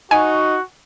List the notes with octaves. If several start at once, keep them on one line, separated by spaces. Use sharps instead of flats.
D#4 F#4 G#5